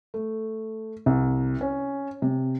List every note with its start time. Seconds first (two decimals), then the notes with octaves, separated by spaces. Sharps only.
0.14 A3
1.06 C2
1.61 C#4
2.22 C3